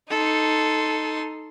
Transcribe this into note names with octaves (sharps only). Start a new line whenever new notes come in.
D#4 A4 C6